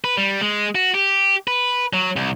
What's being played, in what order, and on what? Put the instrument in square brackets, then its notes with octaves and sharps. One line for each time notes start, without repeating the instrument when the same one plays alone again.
[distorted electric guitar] B4
G3
G#3
F#4
G4
B4
F#3
C2